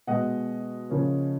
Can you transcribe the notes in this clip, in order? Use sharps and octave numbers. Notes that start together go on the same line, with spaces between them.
B2 G#3 B3 D#5 F#5
C#3 F3 A#3 C#4